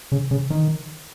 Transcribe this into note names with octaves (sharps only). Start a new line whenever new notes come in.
C#3
C#3
D#3